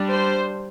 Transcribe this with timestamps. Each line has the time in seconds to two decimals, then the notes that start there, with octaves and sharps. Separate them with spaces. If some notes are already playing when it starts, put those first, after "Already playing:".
Already playing: G3 D4
0.09 C5